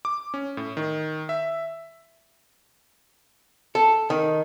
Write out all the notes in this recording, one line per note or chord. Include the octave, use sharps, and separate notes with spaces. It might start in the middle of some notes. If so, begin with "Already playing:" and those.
D6
C#4
A2
D#3
E5
A4
D#3